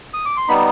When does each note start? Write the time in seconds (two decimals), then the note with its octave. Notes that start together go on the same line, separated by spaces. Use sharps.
0.14 D#6
0.25 D6
0.37 C6
0.48 G3 B3 D#4 B5